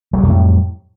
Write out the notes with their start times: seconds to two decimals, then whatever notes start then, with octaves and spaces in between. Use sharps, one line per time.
0.13 F#3
0.18 G3
0.23 F2
0.28 A2